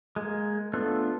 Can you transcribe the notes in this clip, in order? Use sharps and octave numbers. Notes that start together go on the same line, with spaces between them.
G#3 A#3
A3 B3 D4 F4 A4